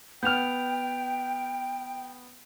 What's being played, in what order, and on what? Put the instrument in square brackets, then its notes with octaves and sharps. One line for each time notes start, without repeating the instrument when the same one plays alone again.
[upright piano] B3 F6 [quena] G5 [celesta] G6 F7